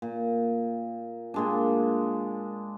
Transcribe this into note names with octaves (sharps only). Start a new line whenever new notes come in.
A#2
A#2 G#3 D4